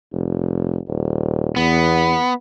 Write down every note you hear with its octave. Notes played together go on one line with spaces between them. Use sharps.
F1
D#1
E2 B3